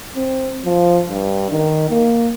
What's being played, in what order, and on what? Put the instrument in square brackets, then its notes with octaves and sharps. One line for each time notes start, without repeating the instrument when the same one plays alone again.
[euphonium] C4
F3
G2
D#3
A#3